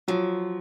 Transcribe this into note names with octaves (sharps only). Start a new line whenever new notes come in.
F3 F#3